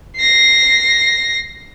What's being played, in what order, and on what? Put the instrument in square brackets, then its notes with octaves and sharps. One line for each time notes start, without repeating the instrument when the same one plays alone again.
[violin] A#6 C7